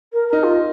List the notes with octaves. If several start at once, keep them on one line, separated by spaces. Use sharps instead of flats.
A#4
D#4 A#4 D#5
F4